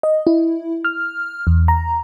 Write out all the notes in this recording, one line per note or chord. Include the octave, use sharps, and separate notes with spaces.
D#5
E4
F6
E2
A#5